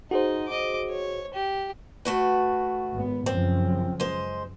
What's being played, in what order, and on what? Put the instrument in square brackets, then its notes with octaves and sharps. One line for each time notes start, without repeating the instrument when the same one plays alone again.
[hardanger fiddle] D#4 [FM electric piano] F#4 G#4 C5
[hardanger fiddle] D#5 D6
C#5
G4
[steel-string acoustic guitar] A3 F#4 B4
[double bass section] G#1 B3
[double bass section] F#2 C#3 F3 [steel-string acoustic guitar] C4
[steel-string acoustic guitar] G#3 C5